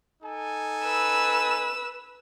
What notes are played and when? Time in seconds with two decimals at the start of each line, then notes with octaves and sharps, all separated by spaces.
0.22 D#4 A4 G#5
0.84 B4 E6